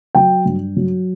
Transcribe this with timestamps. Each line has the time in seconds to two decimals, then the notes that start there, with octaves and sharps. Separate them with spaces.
0.15 F#3 G5
0.45 G2
0.76 F#3